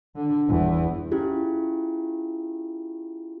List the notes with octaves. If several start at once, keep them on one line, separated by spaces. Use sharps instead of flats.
D3
G1 E2
C#4 E4 F4 G4 G#4